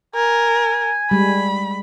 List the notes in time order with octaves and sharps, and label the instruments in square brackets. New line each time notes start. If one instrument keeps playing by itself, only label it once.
[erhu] A#4 [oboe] G#5
[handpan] G3 G#3 [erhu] B5